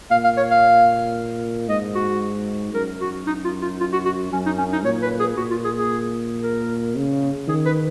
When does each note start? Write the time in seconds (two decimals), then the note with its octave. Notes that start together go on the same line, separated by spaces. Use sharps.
0.11 A#2 F5
0.24 F5
0.37 C#5
0.51 F5
1.69 G#2 D#5
1.95 F#4
2.74 F#2 A#4
3.01 F#4
3.27 D#4
3.44 F4
3.62 F4
3.80 F4
3.92 F#4
4.05 F#4
4.32 F#2 C#4
4.46 D#4
4.58 C#4
4.72 D#4
4.84 A#2 C#5
5.02 B4
5.20 G#4
5.37 A#2 F#4
5.51 F4
5.64 G#4
5.77 G#4
6.43 A#4
6.96 C#3
7.48 D#3 G#4
7.66 B4